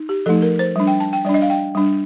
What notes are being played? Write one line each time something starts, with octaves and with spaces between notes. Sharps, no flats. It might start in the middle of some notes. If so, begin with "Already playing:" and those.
Already playing: D#4
G4
F3 A3 D#4 A4
A#4
C5
G3 D4
G5
A5
G5
G3 D4 D5
D#5
F5
G5
G3 D4